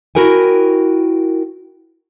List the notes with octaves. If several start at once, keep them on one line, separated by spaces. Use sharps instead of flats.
E4 F#4 A#4 G5 G#5